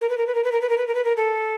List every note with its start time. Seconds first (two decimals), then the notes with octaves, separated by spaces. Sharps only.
0.01 A#4
0.09 B4
0.18 A#4
0.27 B4
0.35 A#4
0.44 B4
0.52 A#4
0.61 B4
0.69 A#4
0.78 B4
0.87 A#4
0.95 B4
1.05 A#4
1.17 A4